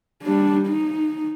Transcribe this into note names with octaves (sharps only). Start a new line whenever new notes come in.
G3 D4
D#4